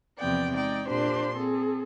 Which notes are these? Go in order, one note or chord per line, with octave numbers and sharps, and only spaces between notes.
E2 C3 F3 B3 D5 G5
G#3 D#4 D5 G5
A#2 D4 G4 C5 C6
C4 G#4 A4